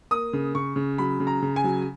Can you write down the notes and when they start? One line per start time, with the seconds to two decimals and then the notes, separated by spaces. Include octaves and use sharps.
0.11 A#3 D#6
0.33 C#3
0.55 C#3 C#6
0.76 C#3
0.98 F#3 B5
1.20 C#3
1.27 A#5
1.42 C#3
1.56 G#5
1.64 F#3